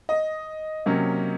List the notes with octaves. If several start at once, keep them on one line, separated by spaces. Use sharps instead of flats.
D#5
C3 F#3 A#3 C#4